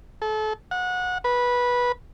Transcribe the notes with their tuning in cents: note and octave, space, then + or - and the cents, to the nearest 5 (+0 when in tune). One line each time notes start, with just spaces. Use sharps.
A4 -30
F#5 -25
B4 -15